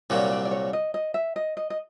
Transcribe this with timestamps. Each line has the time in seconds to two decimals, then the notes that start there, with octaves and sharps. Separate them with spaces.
0.10 C2 A#2 F#3 C#5
0.32 D5
0.45 D5
0.51 C#5
0.73 D#5
0.94 D#5
1.14 E5
1.36 D#5
1.57 D#5
1.70 D#5